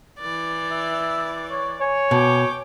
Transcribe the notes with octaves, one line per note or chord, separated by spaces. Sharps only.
E3 D5
E5
C#5
C#5 G#5
B2 G5 D6